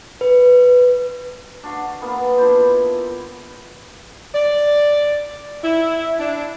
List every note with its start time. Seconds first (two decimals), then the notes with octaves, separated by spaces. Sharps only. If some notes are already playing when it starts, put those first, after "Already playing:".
0.21 B4
1.64 D4 F#4 F5
2.01 A#3 B3 G#4 B5
2.38 D4 E4 F4 C5
4.34 D5
5.64 E4
6.19 D4